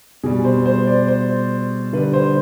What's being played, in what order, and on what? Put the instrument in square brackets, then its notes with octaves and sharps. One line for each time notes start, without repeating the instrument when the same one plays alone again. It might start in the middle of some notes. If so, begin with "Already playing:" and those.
[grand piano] B2 G3 G#4
C5
C5
D5
C5
D3 B4
G3
C5